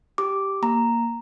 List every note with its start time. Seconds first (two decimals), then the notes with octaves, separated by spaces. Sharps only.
0.18 G4 D6
0.62 A#3 A#5